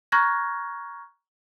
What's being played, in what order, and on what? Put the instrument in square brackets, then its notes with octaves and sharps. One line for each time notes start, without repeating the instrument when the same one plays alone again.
[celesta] A#5 C#6 F6 F#6 G#6 A#6